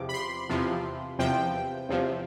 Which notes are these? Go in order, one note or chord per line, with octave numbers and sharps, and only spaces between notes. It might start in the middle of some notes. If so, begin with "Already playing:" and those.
Already playing: E2 C3 F3 D6
B5
C6
E2 C3 F3
E2 C3 F3 G5
E2 C3 F3